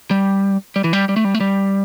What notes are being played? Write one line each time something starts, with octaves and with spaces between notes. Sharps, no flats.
G3
G3
E3
G3
G3
A3
G3
A3
G3